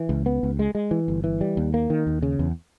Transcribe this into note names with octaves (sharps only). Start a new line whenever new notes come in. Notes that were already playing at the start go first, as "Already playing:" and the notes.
Already playing: E3
C#2
B3
C#2
G#3
G#3
E3
G1
E3
G3
D#2
A#3
D#3
D#2
C#3
E2